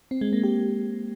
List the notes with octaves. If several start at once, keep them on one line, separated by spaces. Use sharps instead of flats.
C4
G#3
A#3
G4